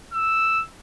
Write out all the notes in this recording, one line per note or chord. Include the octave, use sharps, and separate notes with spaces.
E6